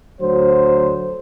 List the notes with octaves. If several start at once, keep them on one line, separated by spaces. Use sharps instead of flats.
D2 F#3 C5